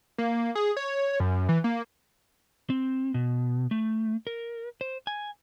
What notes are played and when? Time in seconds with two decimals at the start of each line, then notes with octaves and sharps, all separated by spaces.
0.18 A#3
0.55 G#4
0.77 C#5
1.20 F#2
1.49 E3
1.64 A#3
2.70 C4
3.14 B2
3.71 A3
4.27 A#4
4.81 C5
5.07 G#5